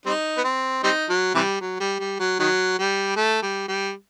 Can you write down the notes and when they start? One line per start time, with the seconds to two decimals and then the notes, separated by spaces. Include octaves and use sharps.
0.06 G3 C4 D#4
0.38 B3
0.44 C4
0.84 G3 C4 D#4
1.09 F#3
1.35 C3 E3 G3
1.61 F#3
1.80 G3
2.00 G3
2.20 F#3
2.40 D#3 F#3
2.79 G3
3.16 A3
3.42 G3
3.68 G3